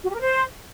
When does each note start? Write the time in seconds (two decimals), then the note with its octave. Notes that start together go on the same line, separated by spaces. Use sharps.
0.04 F#4
0.10 G4
0.15 A#4
0.21 C5